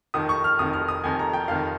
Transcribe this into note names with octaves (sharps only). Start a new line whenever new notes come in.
F1 F2 D#3 D#6
C#6
F6
F1 F2 D#3 D#6
F6
D#6
F1 F2 D#3 G#5
A#5
G5
F1 F2 D#3 F5